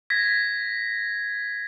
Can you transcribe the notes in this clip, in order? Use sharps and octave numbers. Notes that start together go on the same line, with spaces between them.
G#6 A#6 B6